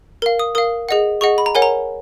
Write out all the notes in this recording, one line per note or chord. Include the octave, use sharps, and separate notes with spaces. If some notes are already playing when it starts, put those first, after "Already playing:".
A#4 F5
D#6
A#4 F5 D#6
G#4 D#5 F#5
G#4 D#5 F#5 C#6
B5
A#5
A#4 C#5 F#5 G#5
A#5